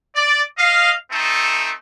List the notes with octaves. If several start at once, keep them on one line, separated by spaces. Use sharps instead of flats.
D5
D#5 F5
A3 C4 D#4 A4